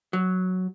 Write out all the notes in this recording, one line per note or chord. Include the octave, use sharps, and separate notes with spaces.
F#3